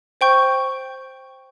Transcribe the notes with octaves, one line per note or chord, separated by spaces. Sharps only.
C5 G5 C#6 G6